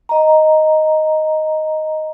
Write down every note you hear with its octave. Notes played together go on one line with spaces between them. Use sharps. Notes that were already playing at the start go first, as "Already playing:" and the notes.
D#5 A#5